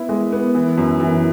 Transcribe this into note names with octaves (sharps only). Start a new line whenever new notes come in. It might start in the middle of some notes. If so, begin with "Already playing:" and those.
Already playing: B3 E4
G#3
B3
E3
F#2
E3